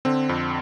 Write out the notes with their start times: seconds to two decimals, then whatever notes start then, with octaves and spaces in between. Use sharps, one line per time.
0.05 D3 C4
0.29 F2